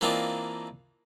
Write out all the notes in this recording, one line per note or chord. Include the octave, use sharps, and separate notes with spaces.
E3 A#3 C4 D4 D#4 F4